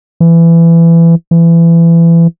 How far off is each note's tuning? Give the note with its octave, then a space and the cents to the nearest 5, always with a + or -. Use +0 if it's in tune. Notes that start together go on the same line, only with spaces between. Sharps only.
E3 +20
E3 +25